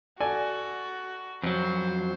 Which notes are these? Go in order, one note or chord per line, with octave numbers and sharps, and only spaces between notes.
F#4 A4 D5 G#5
F2 F#3 C5